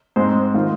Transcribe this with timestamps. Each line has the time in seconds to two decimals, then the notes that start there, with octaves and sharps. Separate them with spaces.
0.16 G#2 G#3 C4 D#4 C5
0.54 D#3 G#3 F4